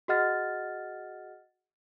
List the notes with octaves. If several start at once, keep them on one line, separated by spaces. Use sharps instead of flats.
F#4 G#4 D#5 F#5 F6 A6